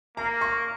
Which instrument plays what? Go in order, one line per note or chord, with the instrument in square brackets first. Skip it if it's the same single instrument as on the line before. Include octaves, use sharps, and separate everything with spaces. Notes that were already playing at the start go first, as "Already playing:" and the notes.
[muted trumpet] A#3 [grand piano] A#5
[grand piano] C#6